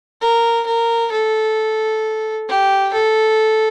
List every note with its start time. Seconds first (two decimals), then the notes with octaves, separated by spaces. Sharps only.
0.21 A#4
0.66 A#4
1.12 A4
2.48 G4
2.93 A4